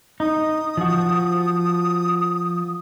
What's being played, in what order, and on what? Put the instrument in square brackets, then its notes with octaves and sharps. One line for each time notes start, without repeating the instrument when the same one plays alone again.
[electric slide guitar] D#4 [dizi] D#6
[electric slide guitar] F3 F#4